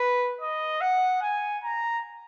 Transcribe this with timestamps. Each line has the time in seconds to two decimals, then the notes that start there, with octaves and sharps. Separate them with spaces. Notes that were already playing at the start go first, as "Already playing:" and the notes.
Already playing: B4
0.41 D#5
0.81 F#5
1.22 G#5
1.64 A#5